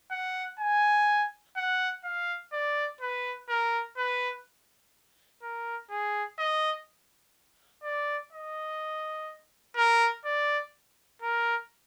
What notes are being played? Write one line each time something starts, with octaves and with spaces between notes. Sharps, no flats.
F#5
G#5
F#5
F5
D5
B4
A#4
B4
A#4
G#4
D#5
D5
D#5
A#4
D5
A#4